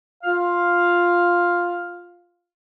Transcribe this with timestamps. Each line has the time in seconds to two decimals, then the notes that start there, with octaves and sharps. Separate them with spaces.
0.24 F4 F5